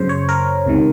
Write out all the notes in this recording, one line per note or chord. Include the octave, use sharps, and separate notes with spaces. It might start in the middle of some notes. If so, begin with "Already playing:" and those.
Already playing: F#2 C#3 C5
C#5
A#4
C#2 C3 D#3